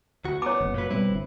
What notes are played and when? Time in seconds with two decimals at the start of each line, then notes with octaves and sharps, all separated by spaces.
0.25 D2 F#4
0.42 B3 C#5 D6
0.60 F#1
0.74 A#2 F#3 B4
0.91 B2 G3 C4 E4 B4
1.09 G1